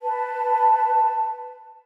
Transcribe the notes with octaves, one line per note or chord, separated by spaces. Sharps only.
B4 A5